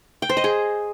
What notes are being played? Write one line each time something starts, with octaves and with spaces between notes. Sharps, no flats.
G5
C5
D#5
G#4